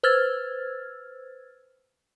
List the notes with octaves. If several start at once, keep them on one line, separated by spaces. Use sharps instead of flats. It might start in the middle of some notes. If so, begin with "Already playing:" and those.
B4 C5 E6 F6 G#6 A6